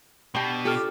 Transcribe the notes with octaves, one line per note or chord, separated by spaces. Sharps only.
B2 D4 G4 G5
F4 G4 A4 F6